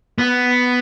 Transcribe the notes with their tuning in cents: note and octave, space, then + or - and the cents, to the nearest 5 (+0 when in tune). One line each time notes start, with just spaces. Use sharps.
B3 +5